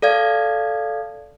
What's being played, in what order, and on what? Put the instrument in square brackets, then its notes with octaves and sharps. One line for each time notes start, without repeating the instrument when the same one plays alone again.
[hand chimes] A4 D5 F5 G#6